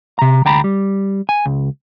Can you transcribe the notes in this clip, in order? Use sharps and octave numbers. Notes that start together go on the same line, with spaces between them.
C3 A#5
D2 G5 A#5 B5
G3
G#5
C#2